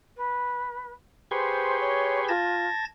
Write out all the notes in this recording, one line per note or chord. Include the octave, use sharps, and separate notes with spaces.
B4
G4 G#4 B4 C5 C6 C#6
C#5
F4 A5 G#6 A#6